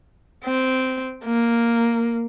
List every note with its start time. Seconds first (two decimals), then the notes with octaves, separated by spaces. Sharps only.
0.45 C4
1.25 A#3